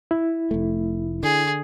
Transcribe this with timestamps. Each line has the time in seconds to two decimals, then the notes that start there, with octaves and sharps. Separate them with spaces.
0.11 E4
0.51 F1 A3
1.23 D3 G#4